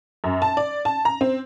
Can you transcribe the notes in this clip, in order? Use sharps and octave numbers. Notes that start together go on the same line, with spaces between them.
F#2
A5
D5
A5
A#5
C4